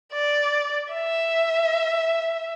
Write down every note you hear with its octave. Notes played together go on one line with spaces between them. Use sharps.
D5
E5